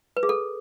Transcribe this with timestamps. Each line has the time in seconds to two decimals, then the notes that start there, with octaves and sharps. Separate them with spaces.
0.17 B4
0.23 G#4
0.29 A4